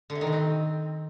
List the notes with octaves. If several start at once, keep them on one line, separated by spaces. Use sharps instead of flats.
D3
C3
D#3
B2
C4